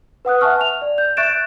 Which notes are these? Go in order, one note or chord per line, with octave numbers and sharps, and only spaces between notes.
B4 F#5 D#6 F#6
E5 F#5 G#5 A5 C#6 F6
F7
D5
G6
E5 C#6 F#6 A6 D7 E7